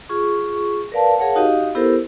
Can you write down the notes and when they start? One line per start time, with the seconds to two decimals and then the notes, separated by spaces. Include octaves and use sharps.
0.09 F4 G#4 C#6
0.92 A#4 B4 D5 F5 A5
1.18 G#4 A#4 C#5 F5 F#5 A5
1.36 D#4 F#4 G4 D#5 F5
1.75 B3 E4 G4 A4 A#4 C5